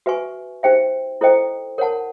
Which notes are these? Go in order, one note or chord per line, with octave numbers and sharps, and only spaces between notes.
F#4 B4 E5 G#5 C#6
D#4 G4 C5 E5 G5
E4 A4 C5 D#5 G5
A#4 C#5 F#5 A5